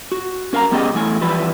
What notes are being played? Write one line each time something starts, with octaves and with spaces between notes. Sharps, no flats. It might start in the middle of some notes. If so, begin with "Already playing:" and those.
F#4
C#4 A#4 F5 F#5 A#5
G3 B3 C#4 G4 G#4 D#5
E2 A3 E4 G#5
E3 F3 G3 E4 B4